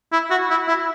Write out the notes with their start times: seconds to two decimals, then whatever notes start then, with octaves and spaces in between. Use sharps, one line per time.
0.12 E4
0.30 F#4
0.50 E4
0.68 E4